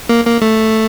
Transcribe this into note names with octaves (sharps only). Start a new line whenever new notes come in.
A#3
A#3
A3